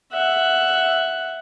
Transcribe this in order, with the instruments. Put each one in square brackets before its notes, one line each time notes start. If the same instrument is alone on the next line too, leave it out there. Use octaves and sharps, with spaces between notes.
[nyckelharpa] E5 F#5